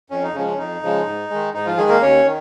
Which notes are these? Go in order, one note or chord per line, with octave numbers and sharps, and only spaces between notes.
F2 C#4
D#4
C#3 F3 G#3 C#4
C#4
F2 D#4
C#3 F3 G#3
G#2
D#3 G#3
G#2 D#4
F3 F4
D#3 G#3 G#4
A#3 A#4
D#2 C#4 C#5
D#3